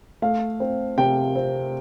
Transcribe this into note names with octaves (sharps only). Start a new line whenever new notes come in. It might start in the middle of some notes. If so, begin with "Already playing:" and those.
A3 F5
C4
C3 G5
C4